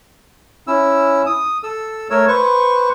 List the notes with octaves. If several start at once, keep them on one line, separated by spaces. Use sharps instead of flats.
C#4 E4 E6
D#6
A4 E6
A3 A#4 C#5 E6
B4 C5 C#6